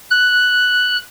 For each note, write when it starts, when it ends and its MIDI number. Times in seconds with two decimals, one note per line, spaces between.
0.10 0.96 90